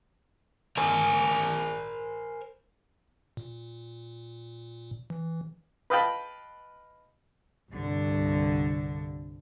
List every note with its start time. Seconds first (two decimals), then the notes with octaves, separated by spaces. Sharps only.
0.77 A#4 C5 G#5
3.37 A#2
5.10 E3
5.90 B4 D#5 F5 G5 A5 B5
7.71 C2 G2 D3